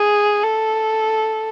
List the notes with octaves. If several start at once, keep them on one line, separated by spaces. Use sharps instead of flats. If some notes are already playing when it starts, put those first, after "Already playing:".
Already playing: G#4
A4